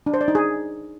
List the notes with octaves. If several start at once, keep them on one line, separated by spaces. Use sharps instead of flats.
D4
C5
D5
D#4
G#4